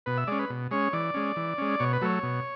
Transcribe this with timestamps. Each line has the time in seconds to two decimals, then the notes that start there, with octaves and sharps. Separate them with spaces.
0.06 B2 B4
0.18 E5
0.27 G#3 C#4 D5
0.39 B4
0.50 B2
0.71 G#3 C#4 C#5
0.93 E3 D5
1.14 G#3 C#4
1.36 E3
1.58 G#3 C#4
1.79 B2 C#5
1.93 B4
2.02 F#3 A3 C#5
2.23 B2